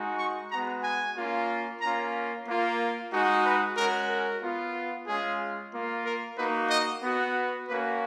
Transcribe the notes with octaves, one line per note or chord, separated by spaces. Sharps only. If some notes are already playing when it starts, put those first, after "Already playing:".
Already playing: G#3 D#4 F#4
C#6
G#3 B3 F#4 A#5
G#5
A#3 C#4 F4
A#3 C#4 F4 A#5
A#3 F4
G#3 D#4 F#4
B4
G#3 C#4 F#4 A#4
A#4
B3 F4
G#3 C#4 F4 G#4
A#3 F4
A#4
A#3 D#4 F#4 B4
D#5
B3 F#4
A#3 C#4 F#4 B4